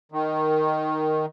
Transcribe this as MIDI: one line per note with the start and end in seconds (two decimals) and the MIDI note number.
0.12 1.26 51